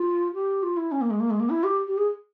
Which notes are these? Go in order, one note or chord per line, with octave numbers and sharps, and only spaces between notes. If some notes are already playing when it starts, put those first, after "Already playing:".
Already playing: F4
G4
F4
E4
C#4
A#3
G#3
A#3
G#3
A#3
E4
G4
G4
G#4